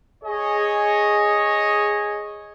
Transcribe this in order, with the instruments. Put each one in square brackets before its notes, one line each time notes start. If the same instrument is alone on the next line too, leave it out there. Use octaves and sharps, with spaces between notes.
[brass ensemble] G#4 C#5 D#5